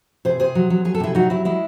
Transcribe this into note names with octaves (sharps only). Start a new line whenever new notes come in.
C3 G#4 C5
C3 G#4 C5
F#3
F#3
F#3 G#4
A4
C3 E4 G#4
F#3 D#4 F#4
F#3 E4
G#3 E4